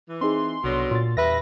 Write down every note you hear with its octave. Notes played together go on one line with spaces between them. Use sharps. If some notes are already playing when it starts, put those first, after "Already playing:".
E3
C4 D#4 G#4 C6
C2 B2 D3 F#3 A#6
A#2 C6 A6
E2 G2 B4 E5 A#6